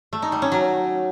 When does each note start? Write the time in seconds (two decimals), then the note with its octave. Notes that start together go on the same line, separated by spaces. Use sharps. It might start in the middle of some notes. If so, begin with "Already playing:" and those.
0.13 A3
0.22 D#4
0.32 G3
0.42 C#4
0.52 F#3